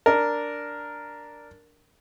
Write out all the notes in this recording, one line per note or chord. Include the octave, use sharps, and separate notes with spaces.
D4 A#4